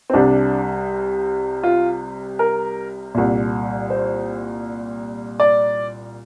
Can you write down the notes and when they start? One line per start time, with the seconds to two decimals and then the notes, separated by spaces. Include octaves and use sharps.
0.10 C4
0.13 C2 C3 D4
1.63 F4
2.39 A#4
3.15 C2 A#2
3.90 C5
5.40 D5